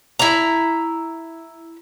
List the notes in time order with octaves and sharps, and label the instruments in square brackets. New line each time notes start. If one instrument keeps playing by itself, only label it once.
[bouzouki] E4 A#5